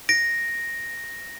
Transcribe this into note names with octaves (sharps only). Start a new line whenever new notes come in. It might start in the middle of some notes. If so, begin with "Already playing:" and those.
A#6 D7